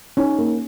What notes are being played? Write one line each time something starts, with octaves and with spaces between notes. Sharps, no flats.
C#4 D#4
A#3